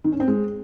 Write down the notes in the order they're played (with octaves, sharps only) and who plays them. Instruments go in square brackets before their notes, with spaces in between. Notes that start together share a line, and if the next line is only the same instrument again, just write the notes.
[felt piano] D#3
C#4
C4
G#3